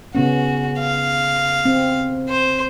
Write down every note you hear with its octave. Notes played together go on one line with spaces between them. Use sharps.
C#3 B3 C#4 F#4
F5
C4
C5